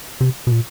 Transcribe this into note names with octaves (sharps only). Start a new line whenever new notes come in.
C3
B2
A#2